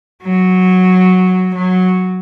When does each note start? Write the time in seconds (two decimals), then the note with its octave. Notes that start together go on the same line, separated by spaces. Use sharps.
0.23 F#3
1.55 F#3